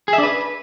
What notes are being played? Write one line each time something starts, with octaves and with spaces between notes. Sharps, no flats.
G#4
E5
D4
B4